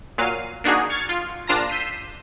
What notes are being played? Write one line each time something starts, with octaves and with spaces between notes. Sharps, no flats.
A#2 F#3 F5 D#7
A#3 D4 D#4 F#4 G#4
C#6 F6 G#6 A6 C#7
F4
A#1 D4 F4 A5 A#5 A#6
E6 G6 B6 C7 D#7